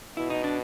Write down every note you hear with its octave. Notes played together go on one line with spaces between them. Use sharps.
B2 E4
D#4
D4